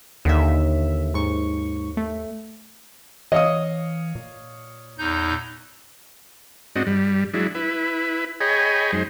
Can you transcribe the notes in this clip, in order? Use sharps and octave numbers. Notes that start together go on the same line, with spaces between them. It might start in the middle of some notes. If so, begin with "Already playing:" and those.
D#2 D3 D#3 E5
G#2 C#6
A3
E3 C#5 D#5 F5 D#6
A#2
E2 D#4 G6
G#2 C4 D4 F#4 D#5
G2 G3
F#3 G#3 D4 E4
E4 B4
G#4 C#5 D#5 G5 G#5 B5
F#2 G#3 D#4 C5